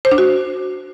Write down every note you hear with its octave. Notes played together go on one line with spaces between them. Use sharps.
C5
D4
F#4